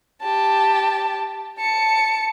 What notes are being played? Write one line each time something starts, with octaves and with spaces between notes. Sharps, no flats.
G4 A5
A5 C#7